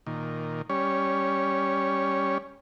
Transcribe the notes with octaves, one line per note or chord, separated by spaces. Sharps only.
A#2 D#3
G3 C#4 C#5